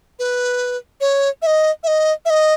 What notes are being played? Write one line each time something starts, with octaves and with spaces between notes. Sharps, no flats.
B4
C#5
E5
D#5
E5
D#5
E5
D#5